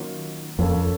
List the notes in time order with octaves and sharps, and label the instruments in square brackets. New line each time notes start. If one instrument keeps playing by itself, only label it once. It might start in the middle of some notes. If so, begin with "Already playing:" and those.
Already playing: [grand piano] D#3 F#3 A#3 C#4 F4
[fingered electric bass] F2 [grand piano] A#3 C#4 F4 A4 C#5